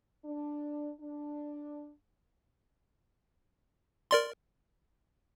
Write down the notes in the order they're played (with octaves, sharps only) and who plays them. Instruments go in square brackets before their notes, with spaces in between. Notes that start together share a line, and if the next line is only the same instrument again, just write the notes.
[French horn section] D4
D4
[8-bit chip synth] A#4 D5 C6